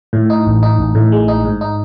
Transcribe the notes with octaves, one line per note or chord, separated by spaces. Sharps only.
A2
D#4
A1
D#4
A1
A2
G#3
D#4
G#2
D#4